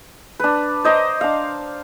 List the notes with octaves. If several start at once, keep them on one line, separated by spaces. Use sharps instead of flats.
D4 B4
C5 D#5 A#5 D6
D4 F5